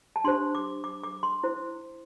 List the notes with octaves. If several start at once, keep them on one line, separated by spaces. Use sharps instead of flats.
A5
D4 G4 C5 C6
D6
D6
D6
C6
E4 C5